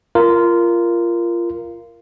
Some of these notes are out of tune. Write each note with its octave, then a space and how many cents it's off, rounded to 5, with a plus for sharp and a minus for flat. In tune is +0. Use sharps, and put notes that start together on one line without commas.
F4 -20 A#4 +0